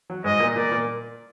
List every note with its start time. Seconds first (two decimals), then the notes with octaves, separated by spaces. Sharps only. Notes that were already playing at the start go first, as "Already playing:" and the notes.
0.10 F#3
0.24 G#2 G#3 D#5
0.40 A#2 A#3
0.56 A#2 A#3 D5
0.71 A#2 A#3